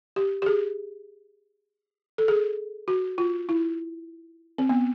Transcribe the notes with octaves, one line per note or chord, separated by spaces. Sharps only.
G4
G4
G#4
A4
G#4
F#4
F4
E4
C4
B3